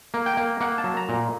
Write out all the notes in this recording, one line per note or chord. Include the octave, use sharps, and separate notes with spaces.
A#3
G5
A#3
A#3 F#5
A5
F#3
A#5
A#2